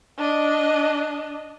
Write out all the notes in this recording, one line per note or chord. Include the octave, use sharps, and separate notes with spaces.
D4 D#5